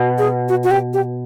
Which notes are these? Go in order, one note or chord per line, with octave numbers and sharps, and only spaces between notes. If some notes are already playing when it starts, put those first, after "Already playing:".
Already playing: B2
G#4
F#4
F#4
G4
G4